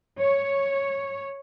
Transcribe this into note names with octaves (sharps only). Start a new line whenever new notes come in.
C#5